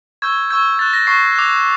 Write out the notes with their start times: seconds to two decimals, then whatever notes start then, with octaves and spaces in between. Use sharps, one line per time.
0.22 C#6 E6 G6 G#6
0.50 C#6 E6 G6 G#6
0.79 C#6 F#6 A6
0.93 A#6
1.07 C#6 F#6 C7
1.36 D6 F#6